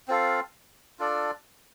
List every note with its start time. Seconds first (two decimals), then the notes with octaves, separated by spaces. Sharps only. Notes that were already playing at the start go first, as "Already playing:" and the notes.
0.08 C4 F4 A4 F5
0.99 D4 F4 A4 D5